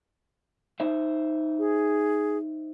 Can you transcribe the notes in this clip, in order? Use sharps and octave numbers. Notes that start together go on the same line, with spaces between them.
D#4 C5 E5
G#4